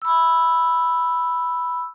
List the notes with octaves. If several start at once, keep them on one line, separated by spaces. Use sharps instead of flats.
B5 E6